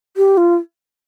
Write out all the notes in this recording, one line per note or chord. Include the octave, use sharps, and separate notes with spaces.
G4
F4